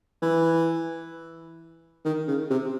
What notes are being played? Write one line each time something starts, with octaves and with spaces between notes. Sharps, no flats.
E3
D#3
C#3
C3